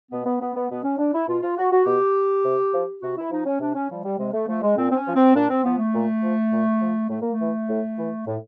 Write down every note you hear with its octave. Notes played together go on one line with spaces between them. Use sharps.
B2 B3
B3
B3
B3
B2 B3
C#4
D4
E4
B2 F4
F4
F#4
F#4
B2 G4
C3
F3
C3 F#4
E4
F3 D#4
C#4
C3 D4
C#4
F3 G3
G3
C3 G#3
A3
F3 A3
G#3
A#2 C4
C4
C#4
F3
C4
A#2 D4
C4
F3 B3
A3
A#2
F3
A#2
F3
A2 A3
A#3
A3
E3
A2
E3
A2